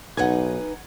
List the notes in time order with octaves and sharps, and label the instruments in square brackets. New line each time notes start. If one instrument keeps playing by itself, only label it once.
[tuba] B1 [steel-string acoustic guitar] D#4 B4 G#5 [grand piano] F#5 G#6